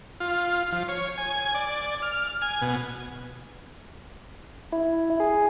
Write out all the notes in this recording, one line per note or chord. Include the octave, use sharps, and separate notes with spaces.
F4
F3
C#5
G#5
D5
F6
G#5
B2
E4
G#4